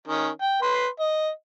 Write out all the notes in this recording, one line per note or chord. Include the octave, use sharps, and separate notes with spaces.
D#3 C#4
G5
B4 C6
D#5